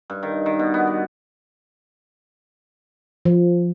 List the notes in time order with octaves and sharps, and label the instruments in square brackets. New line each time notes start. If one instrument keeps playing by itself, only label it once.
[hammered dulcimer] G2
D#3
D#3
B2
B3
D5
[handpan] F3